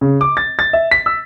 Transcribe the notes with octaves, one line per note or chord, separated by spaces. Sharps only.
C#3
D6
A6
A6
E5
B6
E6